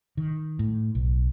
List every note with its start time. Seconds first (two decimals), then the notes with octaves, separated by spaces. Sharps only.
0.17 D#3
0.59 A2
0.95 B1